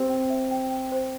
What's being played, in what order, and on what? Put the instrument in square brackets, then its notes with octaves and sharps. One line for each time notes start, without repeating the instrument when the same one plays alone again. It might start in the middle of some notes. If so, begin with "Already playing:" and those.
Already playing: [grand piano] C4 [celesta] G4
[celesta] G5
E5
G5
G5
C5